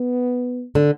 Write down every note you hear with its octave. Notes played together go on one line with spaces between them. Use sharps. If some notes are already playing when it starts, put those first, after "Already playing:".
Already playing: B3
D3